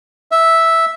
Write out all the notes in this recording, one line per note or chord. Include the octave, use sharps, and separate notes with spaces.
E5